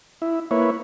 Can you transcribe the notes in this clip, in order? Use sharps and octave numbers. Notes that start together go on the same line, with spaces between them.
E4
A#3 E4 B4 C#5